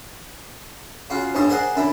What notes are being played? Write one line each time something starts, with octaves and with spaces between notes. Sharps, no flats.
C#3 F4 F#4
A#1 G2 C#4 C#6 D#6
G#4 A#4 C5 D5 F#5
F#2 D3 E4